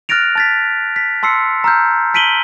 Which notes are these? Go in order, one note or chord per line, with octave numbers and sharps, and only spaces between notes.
F6 F#6 A6 A#6 D7 F7
A5 A6 B6
B6
A5 C6 E6 C7 C#7
A#5 E6 F6 G6
A5 B6 D7 D#7 F#7 G7